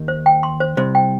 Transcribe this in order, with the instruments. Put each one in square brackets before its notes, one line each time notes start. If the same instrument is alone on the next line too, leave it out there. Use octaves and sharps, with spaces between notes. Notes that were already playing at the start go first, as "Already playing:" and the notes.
Already playing: [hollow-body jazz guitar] D#2 D#3
[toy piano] C5
G5
C6
C5
[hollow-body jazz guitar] C2 C3 [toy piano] C5
[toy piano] G5